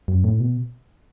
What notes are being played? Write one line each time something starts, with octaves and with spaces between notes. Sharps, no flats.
F#2
A2
B2